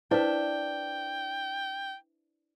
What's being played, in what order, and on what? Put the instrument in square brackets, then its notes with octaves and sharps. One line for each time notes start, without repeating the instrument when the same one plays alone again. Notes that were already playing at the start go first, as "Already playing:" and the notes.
[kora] D4 E5 [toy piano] E4 B4 C5 [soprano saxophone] G5